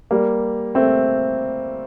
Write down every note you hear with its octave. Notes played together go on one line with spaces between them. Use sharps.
G3 A#3
A3 C4